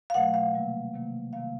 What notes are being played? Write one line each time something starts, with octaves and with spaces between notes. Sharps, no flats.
F5
B2 F#3 A3 F#5
F5
C3 D#3 G3 A#3
C3 D#3 G3 A#3
C3 D#3 G3 A#3 F5